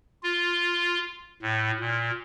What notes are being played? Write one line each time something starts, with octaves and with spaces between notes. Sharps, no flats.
F4
A2
A#2